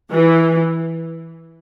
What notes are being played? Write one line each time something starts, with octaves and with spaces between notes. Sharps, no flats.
E3